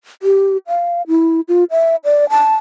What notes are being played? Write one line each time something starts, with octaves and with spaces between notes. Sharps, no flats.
G4
F5
E4
F4
E5
D5
A5